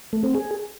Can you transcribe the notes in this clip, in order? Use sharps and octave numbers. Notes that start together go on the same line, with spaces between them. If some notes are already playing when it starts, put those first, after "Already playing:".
A3
C4
G#4